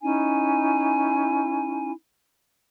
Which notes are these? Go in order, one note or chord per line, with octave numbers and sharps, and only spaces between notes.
C#4 D#4 E4 G#5